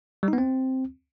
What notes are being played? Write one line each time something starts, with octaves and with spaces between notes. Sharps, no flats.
G3
D#4
B3
C4